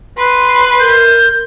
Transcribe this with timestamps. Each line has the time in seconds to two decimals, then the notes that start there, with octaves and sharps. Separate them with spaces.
0.18 B4 C6
0.80 A#4 G6